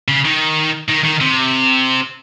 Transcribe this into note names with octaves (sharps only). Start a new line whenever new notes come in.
C#3
D#3
D#3
D#3
C3